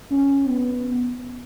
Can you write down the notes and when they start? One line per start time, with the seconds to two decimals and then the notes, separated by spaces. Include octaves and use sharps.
0.11 C#4
0.49 B3